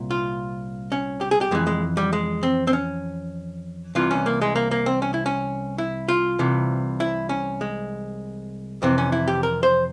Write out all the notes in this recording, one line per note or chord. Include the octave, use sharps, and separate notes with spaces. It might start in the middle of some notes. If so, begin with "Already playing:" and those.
Already playing: C2 A#2
F4
C#4
G4
G#4
G4
F2 E3 G#3
G#3
G3
G#3
C4
C4
C#4
C2 C3 E3 F4
C#4
A#3
G#3
A#3
A#3
C4
C#4
E4
C#4
E4
F4
C2 C3 E3
E4
C#4
G#3
F2 C3 E3 C4
C#4
E4
G4
A#4
C5